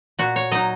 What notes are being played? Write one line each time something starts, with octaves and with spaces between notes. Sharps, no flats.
A#2 F#4
C#5
F#3 D#4 D#5